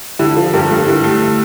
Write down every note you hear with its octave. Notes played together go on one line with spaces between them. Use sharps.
D3 E4 G4
F3 F4 A4
G2 G4 A#4
G2 F4 A4
D3 E4 G4
A3